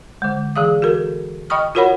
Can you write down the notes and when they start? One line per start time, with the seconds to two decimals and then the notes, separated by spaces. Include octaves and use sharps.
0.22 D3 G#3
0.56 E3 G#4 F5 D#6
0.82 F#4 A4 A#4
1.50 D#5 G5 B5 C#6 D#6 F6
1.75 F4 F#4 A#4 C#5 F#5 B5